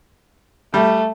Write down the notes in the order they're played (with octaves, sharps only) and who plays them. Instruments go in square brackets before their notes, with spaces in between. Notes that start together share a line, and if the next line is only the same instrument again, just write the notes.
[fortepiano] G3 [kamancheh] A3